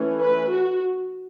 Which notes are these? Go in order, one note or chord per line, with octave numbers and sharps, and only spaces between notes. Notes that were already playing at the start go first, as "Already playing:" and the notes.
Already playing: E3 A3 C#4
B4
F#4